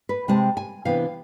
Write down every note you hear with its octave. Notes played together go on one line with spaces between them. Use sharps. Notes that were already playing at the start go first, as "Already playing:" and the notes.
B4
C3 G#3 C4 A5
G#5
C3 E3 B3 D4 F5